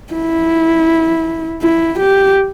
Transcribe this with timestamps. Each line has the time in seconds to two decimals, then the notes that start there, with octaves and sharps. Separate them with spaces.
0.13 E4
1.62 E4
1.99 G4